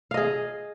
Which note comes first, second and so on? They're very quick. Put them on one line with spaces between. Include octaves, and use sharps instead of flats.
F5 D#5 G#4